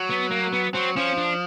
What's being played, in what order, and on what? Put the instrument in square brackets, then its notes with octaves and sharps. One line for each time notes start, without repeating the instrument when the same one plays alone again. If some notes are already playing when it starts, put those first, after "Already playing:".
Already playing: [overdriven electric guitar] F#3
[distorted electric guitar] B3
A#3
B3
[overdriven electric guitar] F#3 [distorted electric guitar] C4
[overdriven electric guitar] F3 [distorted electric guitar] C#4
[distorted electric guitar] D4